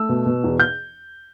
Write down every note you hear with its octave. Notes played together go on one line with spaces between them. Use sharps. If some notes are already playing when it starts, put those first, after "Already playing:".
Already playing: A3 E6
B2
B2
E2
G6